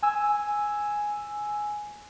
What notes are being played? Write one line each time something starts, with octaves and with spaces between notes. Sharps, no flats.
G#5 E6